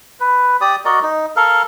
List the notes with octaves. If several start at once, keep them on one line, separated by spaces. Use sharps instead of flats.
B4
G4 D5 D#6
F#4 A#4 D5 D#5
D#4
A4 A#4 F5